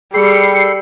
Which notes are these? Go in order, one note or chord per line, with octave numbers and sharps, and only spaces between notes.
G3 G#4 A4 G5 B5 C7 C#7